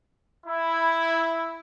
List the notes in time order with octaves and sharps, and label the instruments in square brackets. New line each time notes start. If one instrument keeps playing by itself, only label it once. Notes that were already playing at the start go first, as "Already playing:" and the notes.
[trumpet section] E4